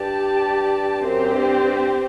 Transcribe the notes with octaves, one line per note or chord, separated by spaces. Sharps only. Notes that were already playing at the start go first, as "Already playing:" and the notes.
Already playing: G2 G4 D5 A5
F#2 C4 G4 C5
G2
G2